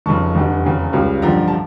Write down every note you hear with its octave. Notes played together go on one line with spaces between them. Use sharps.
F1 F2 C#3 A5 C#6
F1 E2 D3 G3
E1 E2 C#3
C#2 C#3 G3
A1 G2 D3 F3 G5 A#5
A5